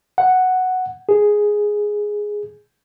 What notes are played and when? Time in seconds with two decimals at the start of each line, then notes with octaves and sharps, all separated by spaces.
0.18 F#5
1.09 G#4